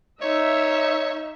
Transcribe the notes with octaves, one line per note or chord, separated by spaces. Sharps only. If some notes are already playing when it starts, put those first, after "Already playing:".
D#4 C#5 E5